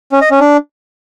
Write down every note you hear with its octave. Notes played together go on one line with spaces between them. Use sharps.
C#4
D#5
C#4
D4